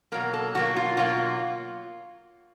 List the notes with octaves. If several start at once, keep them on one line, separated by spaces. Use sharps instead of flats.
B2 F#3 A#3 A#4
A4
B2 F#3 A#3 F#4
F4
B2 F#3 A#3 F4